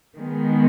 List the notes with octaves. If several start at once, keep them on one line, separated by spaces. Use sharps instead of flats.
D#3 G#3 B3